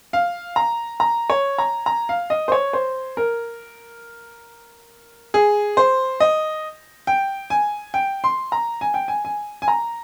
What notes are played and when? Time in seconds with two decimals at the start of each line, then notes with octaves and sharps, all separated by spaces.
0.13 F5
0.56 A#5
1.00 A#5
1.30 C#5
1.58 A#5
1.86 A#5
2.09 F5
2.30 D#5
2.48 C5
2.52 C#5
2.73 C5
3.17 A#4
5.34 G#4
5.77 C5
6.20 D#5
7.07 G5
7.50 G#5
7.94 G5
8.24 C6
8.52 A#5
8.81 G#5
8.94 G5
9.08 G#5
9.25 G#5
9.62 G#5
9.68 A#5